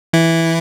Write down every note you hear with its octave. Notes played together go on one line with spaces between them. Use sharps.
E3 E4